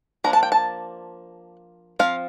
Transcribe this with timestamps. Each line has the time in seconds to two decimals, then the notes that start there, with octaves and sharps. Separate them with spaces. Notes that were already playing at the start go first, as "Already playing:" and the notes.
0.24 F3 A#3 D4 A#5
0.33 A5
0.43 G5
0.52 A5
1.99 F3 C4 F5